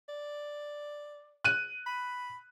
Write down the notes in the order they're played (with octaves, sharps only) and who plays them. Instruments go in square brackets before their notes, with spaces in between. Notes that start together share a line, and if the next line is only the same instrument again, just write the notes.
[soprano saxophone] D5
[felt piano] F#6 D#7
[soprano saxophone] B5